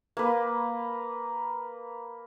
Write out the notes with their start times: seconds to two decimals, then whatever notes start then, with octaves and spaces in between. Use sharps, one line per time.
0.17 A#3 B4